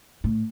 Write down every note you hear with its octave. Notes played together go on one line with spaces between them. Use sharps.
A2